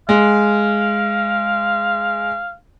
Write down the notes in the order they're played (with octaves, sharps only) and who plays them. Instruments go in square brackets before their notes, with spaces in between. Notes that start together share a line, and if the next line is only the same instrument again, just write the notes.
[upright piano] G#3 [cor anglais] F5